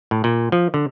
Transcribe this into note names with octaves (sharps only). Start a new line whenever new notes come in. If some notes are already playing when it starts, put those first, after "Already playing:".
A2
A#2
F3
D3